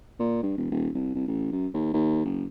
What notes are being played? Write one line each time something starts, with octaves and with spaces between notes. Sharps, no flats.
A#2
G2
E1
D#1
C2
C2
A1
F#2
D#2
D#2
F#1